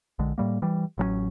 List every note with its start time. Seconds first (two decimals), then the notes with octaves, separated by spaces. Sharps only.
0.19 A#1 D3 G#3
0.38 A2 G3 A#3
0.62 E3 G3
0.98 A1 F#3 G3 C#4